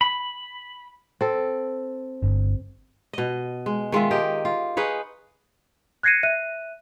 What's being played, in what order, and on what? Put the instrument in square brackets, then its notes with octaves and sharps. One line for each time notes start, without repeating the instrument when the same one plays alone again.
[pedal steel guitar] B5
[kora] C4 A4
[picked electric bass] G1
[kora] B2 D#5
G#3
D#3 G#3 F4 E5
G4 A#4 D#5
F4
D#4 G#4 B4 C#5
[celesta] F#6 G#6 A#6 C7 C#7 D#7
E5 F#6 D#7